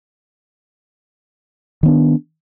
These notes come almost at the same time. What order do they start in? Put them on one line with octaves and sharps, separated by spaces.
D#3 B3 D4